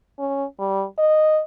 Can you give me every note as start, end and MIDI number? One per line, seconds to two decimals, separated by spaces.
0.19 0.45 61
0.59 0.84 55
0.98 1.42 75